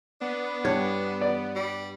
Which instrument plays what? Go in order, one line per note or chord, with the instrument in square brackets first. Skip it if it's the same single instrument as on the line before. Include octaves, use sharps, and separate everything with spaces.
[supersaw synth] B3 [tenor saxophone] D4
[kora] G2 C#5
[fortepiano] D5
[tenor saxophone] G3